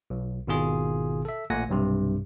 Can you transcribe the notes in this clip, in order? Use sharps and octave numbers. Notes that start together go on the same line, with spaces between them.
B1
G#1 B2 D#3 F4 G#4
A4 E5
A1 A#2 A3 F#5 G#5 A#6
B1 G2 C3